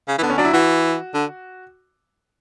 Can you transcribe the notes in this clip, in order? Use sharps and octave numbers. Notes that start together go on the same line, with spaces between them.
C#3
E3
D3 B3
C#4
F#3 D4
E4
E3 F#4
D3